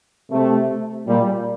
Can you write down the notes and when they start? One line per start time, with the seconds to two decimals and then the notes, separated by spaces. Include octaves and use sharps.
0.31 C3 A3
1.07 A#2 G3